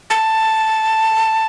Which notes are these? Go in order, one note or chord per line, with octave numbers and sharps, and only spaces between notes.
A5